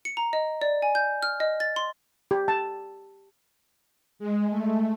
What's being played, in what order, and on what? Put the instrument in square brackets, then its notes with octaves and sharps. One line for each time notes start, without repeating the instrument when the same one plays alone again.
[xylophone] C#7
A#5
D#5
D5
G#5
G6
F6
D#5
A6
C6
[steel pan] G4
A5
[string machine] G#3
A3